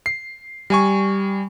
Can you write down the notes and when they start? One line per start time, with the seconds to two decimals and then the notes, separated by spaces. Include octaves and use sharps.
0.06 C7
0.70 G3 G#5 C#6